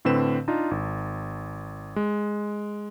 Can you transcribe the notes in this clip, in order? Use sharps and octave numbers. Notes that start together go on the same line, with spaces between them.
A2 D3 C4 B4 E7
D4 D#4 F4
G#1
G#3